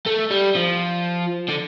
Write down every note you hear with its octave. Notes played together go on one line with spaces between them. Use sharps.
A3
G3
F3
D3